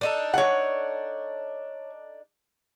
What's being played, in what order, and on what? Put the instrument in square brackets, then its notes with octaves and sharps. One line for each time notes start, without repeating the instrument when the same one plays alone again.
[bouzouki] D4 D#4 A4
[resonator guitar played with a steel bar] C#5 F#5